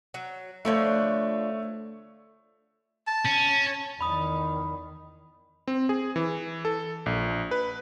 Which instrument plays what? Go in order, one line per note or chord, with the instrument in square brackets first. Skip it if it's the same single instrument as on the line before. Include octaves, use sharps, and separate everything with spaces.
[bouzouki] F#3
[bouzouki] D3 F3 D4 [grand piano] A3 C#5
[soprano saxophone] A5
[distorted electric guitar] C#4
[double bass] E2 D#3 [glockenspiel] B5 D#6
[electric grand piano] C4
G#4
E3
A4
A#1
B4